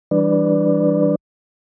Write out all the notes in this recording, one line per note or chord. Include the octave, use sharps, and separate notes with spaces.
E3 G3 D4 B4 D5